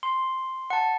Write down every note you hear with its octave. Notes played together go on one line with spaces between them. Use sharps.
C6
F#5 A5